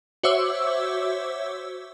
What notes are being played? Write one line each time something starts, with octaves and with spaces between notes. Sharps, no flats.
F#4 C5 C#5 E5 D6 E6